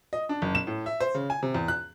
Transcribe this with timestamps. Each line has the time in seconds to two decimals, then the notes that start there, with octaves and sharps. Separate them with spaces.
0.13 D#5
0.29 D4
0.42 F#1
0.55 E7
0.67 A2
0.86 E5
1.00 C5
1.15 C#3
1.30 G#5
1.43 C3
1.54 E2
1.68 F#6